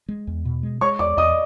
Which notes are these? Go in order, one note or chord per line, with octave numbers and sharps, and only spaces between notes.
G#3
E2
B2
G#3
G#3 C#5 C#6
E2 D5 D6
E2 D#5 D#6